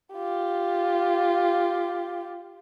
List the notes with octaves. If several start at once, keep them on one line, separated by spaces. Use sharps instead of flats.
F4 G4